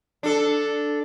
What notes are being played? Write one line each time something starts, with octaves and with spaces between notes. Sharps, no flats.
D4 A4